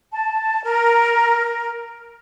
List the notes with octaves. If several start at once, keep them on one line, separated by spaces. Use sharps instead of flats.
A5
A#4